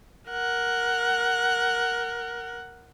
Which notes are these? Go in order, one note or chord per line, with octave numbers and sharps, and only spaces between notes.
A#4 F#5